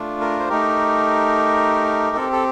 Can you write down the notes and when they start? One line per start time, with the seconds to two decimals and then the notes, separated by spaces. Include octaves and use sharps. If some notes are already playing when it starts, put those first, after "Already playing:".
Already playing: A3 D4 F4
0.21 A#4
0.40 C5
0.49 A3 D#4 G4 A#4
2.16 C4 G4 A4
2.33 A4